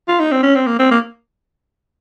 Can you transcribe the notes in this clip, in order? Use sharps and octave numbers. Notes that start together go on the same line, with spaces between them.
F4
D#4
C4
C#4
C4
A#3
C4
A#3